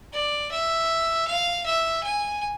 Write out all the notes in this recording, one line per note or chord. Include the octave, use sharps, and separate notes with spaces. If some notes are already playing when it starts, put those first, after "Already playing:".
D5
E5
F5
E5
G#5